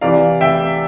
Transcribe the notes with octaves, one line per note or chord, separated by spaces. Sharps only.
C3 E3 D5 F5
E5 G5